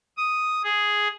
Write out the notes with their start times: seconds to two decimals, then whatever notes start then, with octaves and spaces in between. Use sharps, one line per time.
0.18 D#6
0.64 G#4